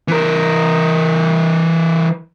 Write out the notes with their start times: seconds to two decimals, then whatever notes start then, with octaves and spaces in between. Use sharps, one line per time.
0.08 E3 A#4